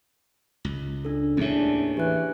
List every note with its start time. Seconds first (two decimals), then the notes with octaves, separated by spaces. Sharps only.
0.65 C#2
1.05 D4 A4
1.37 D#2 A2 C#4 D4 E4 G#4 E5
1.97 E3 G4 F#6